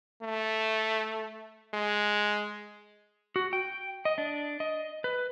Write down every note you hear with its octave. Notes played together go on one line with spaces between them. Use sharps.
A3
G#3
F#4
G5
D#5
D4
D#5
B4